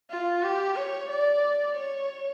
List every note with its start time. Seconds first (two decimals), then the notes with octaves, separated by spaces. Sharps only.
0.10 F4
0.43 G4
0.76 C#5
1.09 D5
1.76 C#5